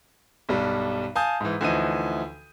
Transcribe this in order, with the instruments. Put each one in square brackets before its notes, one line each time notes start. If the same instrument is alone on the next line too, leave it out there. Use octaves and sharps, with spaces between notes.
[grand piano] B1 G2 G3
F5 G#5 A5 D#6 G6
G#2 E3
D2 E3 F3 D#4 D#7